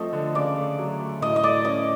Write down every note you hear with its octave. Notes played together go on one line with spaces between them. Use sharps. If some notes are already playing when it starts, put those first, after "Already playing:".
Already playing: F3 A3 C4 D#5
D3
C#3 D5
A3
F#3
A3
A2 D#5
D#5
A3 D5
C#4 D#5